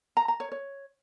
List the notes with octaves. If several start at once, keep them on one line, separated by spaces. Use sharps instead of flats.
A#5
A#5
C#5
C#5